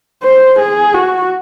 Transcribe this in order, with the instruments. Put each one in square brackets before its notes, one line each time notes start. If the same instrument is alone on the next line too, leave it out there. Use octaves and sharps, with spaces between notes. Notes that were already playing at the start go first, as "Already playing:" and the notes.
[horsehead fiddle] C5
G#4
F#4